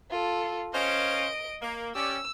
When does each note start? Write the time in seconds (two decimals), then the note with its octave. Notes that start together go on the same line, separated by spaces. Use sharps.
0.11 F4 A4
0.73 C#4 C5 D#5 F5 D7
1.62 A#3
1.95 C#4 G4 D5 E6